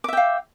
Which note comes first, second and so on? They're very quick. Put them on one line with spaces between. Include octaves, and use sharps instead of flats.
D6 E5 G5 F5